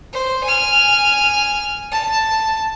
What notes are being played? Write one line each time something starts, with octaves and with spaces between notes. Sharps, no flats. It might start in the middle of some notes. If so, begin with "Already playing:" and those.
C5
G#5 F6
A5